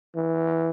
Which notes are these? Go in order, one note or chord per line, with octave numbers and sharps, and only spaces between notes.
E3